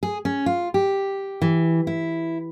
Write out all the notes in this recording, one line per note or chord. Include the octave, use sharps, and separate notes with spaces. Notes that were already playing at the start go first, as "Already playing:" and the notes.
G#4
C#4
F4
G4
E3
E4